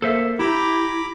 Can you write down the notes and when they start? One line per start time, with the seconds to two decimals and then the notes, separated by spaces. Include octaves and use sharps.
0.02 A#3 A4 C5 E5
0.39 E4 G4 A#5 B5 D6